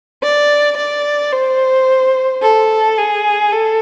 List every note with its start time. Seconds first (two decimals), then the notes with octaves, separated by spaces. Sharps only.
0.23 D5
0.77 D5
1.32 C5
2.42 A4
2.97 G#4
3.52 A4